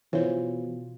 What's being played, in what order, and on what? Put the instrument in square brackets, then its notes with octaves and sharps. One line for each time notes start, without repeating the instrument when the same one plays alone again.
[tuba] B2 [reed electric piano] E3 [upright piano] F4 [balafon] C5 C#5